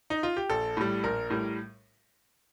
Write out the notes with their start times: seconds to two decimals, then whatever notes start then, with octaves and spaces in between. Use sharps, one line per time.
0.10 D#4
0.23 F4
0.37 G4
0.50 A#1 A4
0.77 A2 G3
1.03 A#1 A#4
1.30 A2 G3